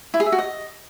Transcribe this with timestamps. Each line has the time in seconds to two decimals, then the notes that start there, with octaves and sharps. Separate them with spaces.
0.14 E4
0.20 G#4
0.26 E5
0.32 F#4
0.39 D#5